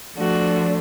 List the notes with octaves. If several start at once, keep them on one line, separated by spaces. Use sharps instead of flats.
F3 A3 D4 F#4